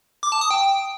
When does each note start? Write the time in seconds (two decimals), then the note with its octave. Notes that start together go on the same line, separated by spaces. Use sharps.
0.23 D6
0.32 A5
0.41 D#6
0.51 G5